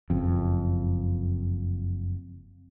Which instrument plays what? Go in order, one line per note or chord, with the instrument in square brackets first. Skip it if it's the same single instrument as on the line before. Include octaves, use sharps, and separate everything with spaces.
[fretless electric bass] F#1 F2